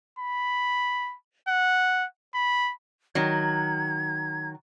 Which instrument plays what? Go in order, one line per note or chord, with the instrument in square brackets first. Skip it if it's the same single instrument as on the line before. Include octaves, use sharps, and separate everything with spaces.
[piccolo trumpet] B5
F#5
B5
[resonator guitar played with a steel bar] D#3 F#3 [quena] G#6